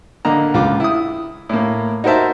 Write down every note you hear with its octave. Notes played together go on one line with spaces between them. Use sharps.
D3 A#3 D#5 A#5
C#2 F4 D6
E4 D#6
A2 A#3
D#4 F#4 A#4 C5 E5 A5